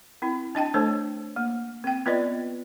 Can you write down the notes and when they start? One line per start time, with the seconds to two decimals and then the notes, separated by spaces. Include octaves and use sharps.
0.22 C4 E4
0.55 D4 D#5 G5 A5
0.74 A3 D4 A4 C5 C#5
1.36 A#3
1.84 C4 G5
2.06 B3 F4 B4 D5 D#5